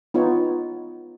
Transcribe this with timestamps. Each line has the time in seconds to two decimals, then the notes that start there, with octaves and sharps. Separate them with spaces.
0.14 B3 D#4 F4 C#5